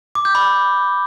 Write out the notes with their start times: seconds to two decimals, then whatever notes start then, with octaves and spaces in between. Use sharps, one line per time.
0.15 D6
0.25 G6
0.35 B5